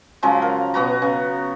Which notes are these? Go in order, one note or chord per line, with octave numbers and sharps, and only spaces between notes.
C#3 F3 F#3 G#3
A#4
B2 B3 F#4 A#5
C#3